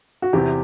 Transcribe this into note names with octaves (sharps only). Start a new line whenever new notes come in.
F#4
E2 C3 E3 G4